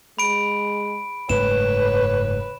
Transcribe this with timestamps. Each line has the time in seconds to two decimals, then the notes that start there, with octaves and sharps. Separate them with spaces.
0.19 G#3 B5 D7
1.29 F#1 G#2 A3 B4 C#5 E7